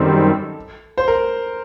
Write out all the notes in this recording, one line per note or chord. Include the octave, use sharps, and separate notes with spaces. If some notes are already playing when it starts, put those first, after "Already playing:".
Already playing: F#2 D#3 G3 C4 A4
C5
A#4